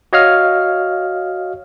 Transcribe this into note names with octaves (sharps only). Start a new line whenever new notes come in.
F#4 C#5 D#5 F5 F6